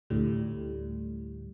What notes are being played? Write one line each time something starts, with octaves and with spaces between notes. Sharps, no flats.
D2 A2 G3